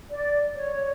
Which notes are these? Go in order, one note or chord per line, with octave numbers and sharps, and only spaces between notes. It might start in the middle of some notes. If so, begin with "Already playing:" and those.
D5
C#5